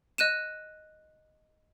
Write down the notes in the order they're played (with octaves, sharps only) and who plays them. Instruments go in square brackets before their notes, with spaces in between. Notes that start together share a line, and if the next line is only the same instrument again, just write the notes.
[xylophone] D#5 F#6 D#7 E7